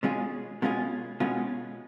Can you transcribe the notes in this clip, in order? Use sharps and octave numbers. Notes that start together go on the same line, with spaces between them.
B2 G#3 C#4 F4 G#4
B2 G#3 C#4 F4 G#4
B2 G#3 C#4 F4 G#4